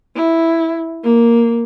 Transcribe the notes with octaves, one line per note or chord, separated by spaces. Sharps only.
E4
A#3